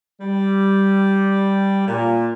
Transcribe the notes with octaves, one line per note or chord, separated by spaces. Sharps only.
G3
A#2